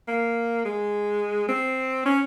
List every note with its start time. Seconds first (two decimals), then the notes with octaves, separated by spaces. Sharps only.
0.08 A#3
0.65 G#3
1.49 C4
2.06 C#4